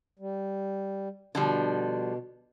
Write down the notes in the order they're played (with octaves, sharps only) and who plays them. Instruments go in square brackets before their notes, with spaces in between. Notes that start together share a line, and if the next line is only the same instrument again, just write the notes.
[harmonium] G3
[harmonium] B2 [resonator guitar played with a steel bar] D3 F3 G3